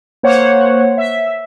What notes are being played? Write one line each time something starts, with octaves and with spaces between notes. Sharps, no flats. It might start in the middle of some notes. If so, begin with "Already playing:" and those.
A#3 C5 C#5 F#5
E5